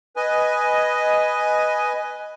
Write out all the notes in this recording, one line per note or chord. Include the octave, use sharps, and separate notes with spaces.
B4 D#5 G#5